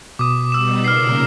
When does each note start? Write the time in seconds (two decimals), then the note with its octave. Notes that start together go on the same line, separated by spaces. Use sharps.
0.19 B2 D6 D#6
0.52 G3 B3 D#4 E6 E7
0.84 A#2 C#3 A#4 F6 C7